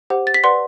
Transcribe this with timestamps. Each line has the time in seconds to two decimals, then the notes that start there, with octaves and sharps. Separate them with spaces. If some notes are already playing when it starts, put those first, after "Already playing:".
0.10 G4 C5 F#5
0.27 A6
0.34 B6
0.43 B4 D5 F#5 C6